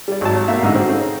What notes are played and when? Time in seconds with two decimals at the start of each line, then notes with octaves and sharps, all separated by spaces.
0.08 G3 D5
0.21 G#1 F#3 A5
0.48 B2 A3 A#3 F#4 E5 F5
0.62 A1 G#2 D3 D#4 E6
0.75 C4 F#4
0.89 C#3 C4 D#4